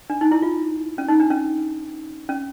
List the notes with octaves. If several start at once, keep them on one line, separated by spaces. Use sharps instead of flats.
D4
D#4
E4
F4
C#4
D#4
D4
C#4
C#4